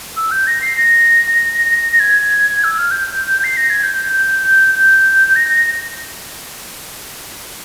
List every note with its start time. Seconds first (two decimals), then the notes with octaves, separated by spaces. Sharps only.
0.17 E6
0.31 G6
0.47 A#6
0.62 C7
0.77 A#6
1.92 A#6
2.00 G#6
2.64 E6
2.78 F6
2.91 G6
3.44 C7
3.57 A#6
3.70 G#6
3.83 G6
4.13 G6
4.43 G6
4.75 G6
5.36 A#6